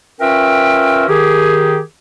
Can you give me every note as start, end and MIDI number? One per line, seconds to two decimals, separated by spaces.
0.20 1.04 61
0.20 1.04 65
0.20 1.04 70
0.20 1.04 71
0.20 1.04 76
0.20 1.04 79
1.08 1.79 51
1.08 1.79 67
1.08 1.79 68